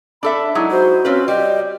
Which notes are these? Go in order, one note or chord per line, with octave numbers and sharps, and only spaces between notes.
D4 A4 E5 B5
F#3 G#3 D#4 E4
F#4 C5
C4 C#4 F4 B4
G3 D#5 G5